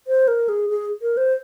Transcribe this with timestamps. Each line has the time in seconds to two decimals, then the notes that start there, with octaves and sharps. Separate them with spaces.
0.07 C5
0.28 A#4
0.49 G#4
0.70 G#4
1.02 A#4
1.17 C5